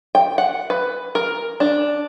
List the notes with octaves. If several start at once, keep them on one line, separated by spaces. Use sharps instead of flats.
G5
F#5
B4
A#4
D4